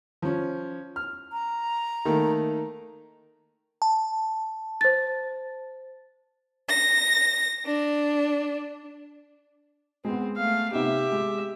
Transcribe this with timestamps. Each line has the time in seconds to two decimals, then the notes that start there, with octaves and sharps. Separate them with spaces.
0.22 F3 C#4
0.96 F6
1.32 A#5
2.05 D#3 A3 A#3
3.82 A5
4.81 C5 A6
6.68 A#6
7.65 D4
10.05 G#3 B3 C4
10.37 A3 F5
10.72 C3 B3 D#4 G4 E5
11.12 G#3